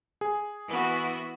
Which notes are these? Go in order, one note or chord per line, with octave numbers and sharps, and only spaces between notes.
G#4
E3 B3 F#4